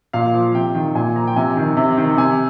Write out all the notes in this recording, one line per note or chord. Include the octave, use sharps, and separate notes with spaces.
A#2 F5
F3
C3 G5
D#3
A#2 G#5
F3 A#5
G5
C3 G#5
D#3
C3
D#3
C3 G#5